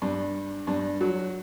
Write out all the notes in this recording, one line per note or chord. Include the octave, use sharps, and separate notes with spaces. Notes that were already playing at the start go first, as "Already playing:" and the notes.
G2
G2
F#3